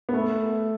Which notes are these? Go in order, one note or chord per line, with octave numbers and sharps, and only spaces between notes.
B3
A3